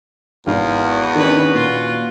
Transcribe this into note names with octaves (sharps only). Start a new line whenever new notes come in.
G#1 E2 F5
F#4
D#3 C#4 D4 B4
A#2 F4